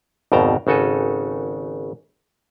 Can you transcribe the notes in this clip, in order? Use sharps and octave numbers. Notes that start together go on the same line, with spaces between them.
G#1 F2 B2 G5 A5 A#5
G#1 C#3 F#4 A4 G#5